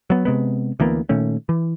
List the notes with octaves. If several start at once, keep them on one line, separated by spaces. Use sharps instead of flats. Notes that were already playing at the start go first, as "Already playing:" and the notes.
F#3 B3
C3 G#3 B3
D2 E3 A#3 B3
A#2 D#3 A3 C#4
E3